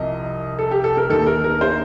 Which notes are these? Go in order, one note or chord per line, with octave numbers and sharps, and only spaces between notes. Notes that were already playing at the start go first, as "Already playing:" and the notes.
Already playing: C2 C3 F3 D#5
A4
G4
A4
A#4
D#2 D#3 A4
A#4
A#4
C5